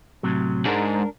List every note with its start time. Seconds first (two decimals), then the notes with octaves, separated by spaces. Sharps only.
0.23 A2 C3 F#3
0.65 G#2 D4 A#4